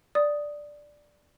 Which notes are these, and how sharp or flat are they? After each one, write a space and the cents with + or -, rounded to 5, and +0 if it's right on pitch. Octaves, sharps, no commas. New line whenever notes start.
D5 +0 D#6 +0